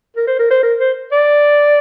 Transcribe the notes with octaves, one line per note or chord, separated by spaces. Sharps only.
A#4
C5
A#4
C5
A#4
C5
D5